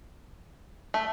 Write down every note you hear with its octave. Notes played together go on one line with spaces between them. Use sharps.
A3